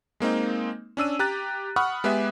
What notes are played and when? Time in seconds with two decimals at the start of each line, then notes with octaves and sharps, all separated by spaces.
0.20 G#3 A#3 C4 D#4
0.97 C#4 D4 E6 D#7
1.19 G4 A#5 F#6 A6
1.76 F#5 B5 C#6 D#6 F6 F#6
2.04 G#3 B3 G4 G#4 B4 E5